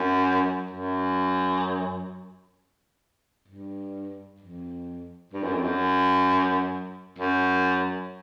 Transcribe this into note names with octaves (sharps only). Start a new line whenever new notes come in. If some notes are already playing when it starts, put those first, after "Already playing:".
Already playing: F#2
F#2
G2
F2
G2
F#2
F2
F#2
F#2